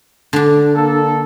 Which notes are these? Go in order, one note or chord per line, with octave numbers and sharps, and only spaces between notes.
D3 D4
A#3 A4